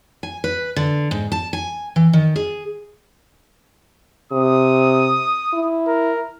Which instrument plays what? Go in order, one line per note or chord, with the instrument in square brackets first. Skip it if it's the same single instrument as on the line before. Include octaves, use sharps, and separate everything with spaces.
[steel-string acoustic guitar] G#5
B4
D3
G#2
A5
G#5
E3
D#3
G#4
[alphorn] C3 [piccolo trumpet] D#6
[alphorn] E4
[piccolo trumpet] A#4